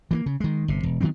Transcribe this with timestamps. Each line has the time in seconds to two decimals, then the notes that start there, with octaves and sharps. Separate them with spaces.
0.11 E3 G3 A#3
0.26 C#3
0.40 D#3 G#3
0.68 G1 C3
0.83 E1
1.01 D#3 F#3 B3 C4